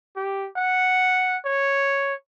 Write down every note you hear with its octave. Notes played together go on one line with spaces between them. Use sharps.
G4
F#5
C#5